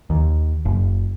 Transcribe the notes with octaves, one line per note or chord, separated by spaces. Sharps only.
D#2
F#1